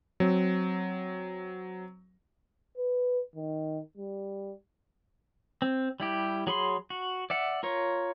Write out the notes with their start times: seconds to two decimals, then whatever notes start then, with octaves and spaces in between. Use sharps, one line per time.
0.20 F#3 C4
2.77 B4
3.36 D#3
3.97 G3
5.62 C4
6.00 G3 E4 G4
6.47 F#3 G#4 B5 C6
6.90 F#4
7.30 D5 E5 F#5
7.63 F4 A#4 C#5